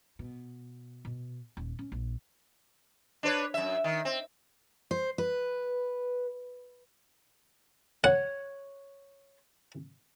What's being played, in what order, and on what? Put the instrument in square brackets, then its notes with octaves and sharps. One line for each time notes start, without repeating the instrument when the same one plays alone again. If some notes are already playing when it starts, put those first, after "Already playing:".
[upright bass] B2
B2
D#1
C#4
A#1
[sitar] D4 B4 C#5
F#2 E5
D#3
C4
[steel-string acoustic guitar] C5
B4
[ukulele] C#5 [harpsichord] F#5